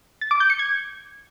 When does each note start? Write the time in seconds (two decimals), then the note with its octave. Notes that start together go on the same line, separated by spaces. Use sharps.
0.21 A6
0.31 D6
0.40 G6
0.50 C#7
0.59 G#6